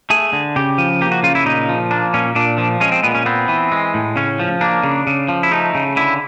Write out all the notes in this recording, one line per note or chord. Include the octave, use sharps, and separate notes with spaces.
A3 G#4
D3
C#3 G4
F3
A#3 G4
F#4
C#3 F4
E4
A#2 D#4
F3
A#3 D4
A#2 C#4
A#2 D4
F3
G#3 C#4
C4
A#2 B3
C#4
B3 C4
E3
G#3
A2
C#3 C#4
F3
A#3 D4
C#3
C#3
F3
E4
A3 D#4
C#3
D3 E4